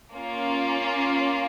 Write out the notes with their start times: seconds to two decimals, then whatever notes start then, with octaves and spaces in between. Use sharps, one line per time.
0.14 A#3 C#4 F4